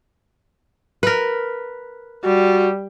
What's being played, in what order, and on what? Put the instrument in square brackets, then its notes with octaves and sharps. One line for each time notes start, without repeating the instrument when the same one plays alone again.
[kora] A#4 B4
[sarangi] G3 [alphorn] F#4